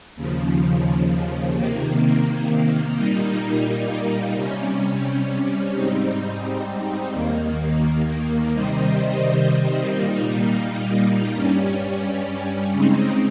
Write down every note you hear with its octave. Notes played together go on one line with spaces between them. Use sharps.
D#2 C#3 F3
C3 D#3 A#3
A#2 G3 A#3 D#4
C3 G3 C#4
G#2 G3 C4 D#4
D#2 D#3 A#3
C3 D#3 G3 C4 D#4
A#2 G3 A#3 D#4
G2 G3 C#4
C#3 G#3 C4 D#4